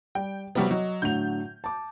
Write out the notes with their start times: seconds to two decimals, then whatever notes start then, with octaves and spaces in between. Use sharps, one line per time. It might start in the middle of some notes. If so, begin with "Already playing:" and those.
0.15 G3 G5
0.55 C3 F#3 G3 B3
0.71 F#3 D#5
1.02 A2 D3 F#3 G6 F7
1.64 A5 D6